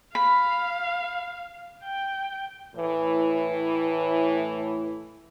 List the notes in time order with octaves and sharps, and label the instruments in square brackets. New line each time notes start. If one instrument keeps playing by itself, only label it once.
[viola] F5 [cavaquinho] B5
[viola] G5
[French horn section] A2 E3